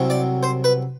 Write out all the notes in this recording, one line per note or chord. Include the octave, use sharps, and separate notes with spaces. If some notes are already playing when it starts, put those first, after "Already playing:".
Already playing: C2 C3 F#3
D5
C5
B4